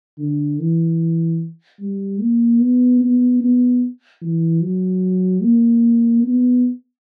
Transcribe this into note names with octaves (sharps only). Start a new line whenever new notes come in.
D3
E3
G3
A#3
B3
B3
B3
E3
F#3
A#3
B3